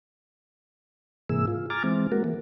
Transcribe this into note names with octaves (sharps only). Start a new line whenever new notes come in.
G#2 C3 E3 A#3 G#4 E6
F4
G#5 A#5 D6 F6 A6
E3 G#3 C4
G#3 A#3 F#4 A#4
E3 A#3